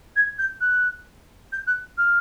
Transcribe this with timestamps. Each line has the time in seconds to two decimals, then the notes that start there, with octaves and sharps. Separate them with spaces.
0.16 G#6
0.38 G6
0.60 F#6
1.52 G6
1.66 F#6
1.97 F6